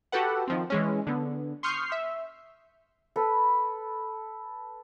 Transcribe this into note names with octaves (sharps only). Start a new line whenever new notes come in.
F#4 G4 A4 B4 F#5
D#3 F3 C4
E3 G#3 C#4
D3 B3
C6 C#6 D#6 F6 G6 C7
E5
A4 B4 B5